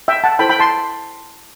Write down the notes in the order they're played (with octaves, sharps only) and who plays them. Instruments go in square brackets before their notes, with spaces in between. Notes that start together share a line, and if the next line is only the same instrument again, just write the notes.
[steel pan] E5 G5
F#5 A5
E4 A4 C5 G5 B5
G5 B5
A5 C6